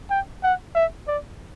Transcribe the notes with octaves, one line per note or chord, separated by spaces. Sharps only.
G5
F#5
E5
D5